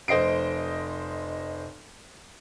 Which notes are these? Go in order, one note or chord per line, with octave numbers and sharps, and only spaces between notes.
F1 C5 D#5 C7 D7